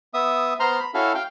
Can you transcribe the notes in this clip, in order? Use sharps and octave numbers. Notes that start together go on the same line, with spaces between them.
B3 E5 D#6
B3 C5 A#5 C6 F6
B5
C#4 E4 F#4 A4 F5
F5 G5